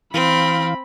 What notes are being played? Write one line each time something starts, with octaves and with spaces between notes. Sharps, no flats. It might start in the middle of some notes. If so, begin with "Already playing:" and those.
E3 C4 F5 B5